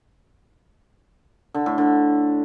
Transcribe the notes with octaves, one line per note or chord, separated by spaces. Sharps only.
D3
A2
D3